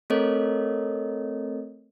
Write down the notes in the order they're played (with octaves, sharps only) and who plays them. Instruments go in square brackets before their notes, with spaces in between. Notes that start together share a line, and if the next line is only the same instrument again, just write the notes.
[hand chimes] A3 C4 A4 A#4 C#5 D#5